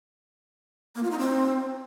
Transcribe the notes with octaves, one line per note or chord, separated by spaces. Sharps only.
A#3
F4
D#4
C4